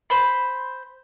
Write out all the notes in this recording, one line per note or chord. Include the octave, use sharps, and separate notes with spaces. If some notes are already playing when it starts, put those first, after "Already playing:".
C5 B5